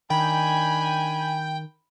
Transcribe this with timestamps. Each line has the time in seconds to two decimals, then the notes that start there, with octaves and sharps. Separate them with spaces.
0.10 D#3 D4 G5 G#5 B5